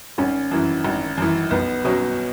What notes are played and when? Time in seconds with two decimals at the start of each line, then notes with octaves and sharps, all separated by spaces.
0.18 G#1 C#4
0.51 F#2 E3
0.84 G#1
1.18 F#2 E3
1.51 B1 B3
1.84 B2 F#3 C#4